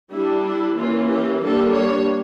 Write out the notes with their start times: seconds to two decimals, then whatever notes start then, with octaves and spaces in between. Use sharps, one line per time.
0.13 G3 D4 E4
0.45 E4
0.78 E3 A#3 C#4 F4
1.09 G4
1.42 G3 A#3 D4 A4
1.75 C#5